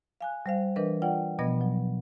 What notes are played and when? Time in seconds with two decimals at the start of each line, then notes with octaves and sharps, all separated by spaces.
0.21 F5 G#5 F#6
0.46 G3 C5 F5
0.76 E3 D4 A#4 B4 D#5
1.02 F4 D5 F#5 G5
1.39 B2 F3 B3 D#5 A#6
1.61 F#3